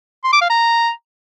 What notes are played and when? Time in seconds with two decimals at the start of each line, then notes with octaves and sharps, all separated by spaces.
0.24 C6
0.33 D6
0.41 F5
0.50 A#5